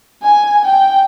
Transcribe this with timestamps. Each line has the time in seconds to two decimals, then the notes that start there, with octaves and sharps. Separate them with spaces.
0.23 G#5
0.64 G5